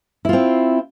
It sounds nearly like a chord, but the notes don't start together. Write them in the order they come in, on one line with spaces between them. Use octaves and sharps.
E4 F4 C4